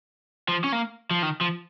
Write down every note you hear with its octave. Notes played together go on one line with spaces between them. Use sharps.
F3
C#4
A#3
F3
D#3
F3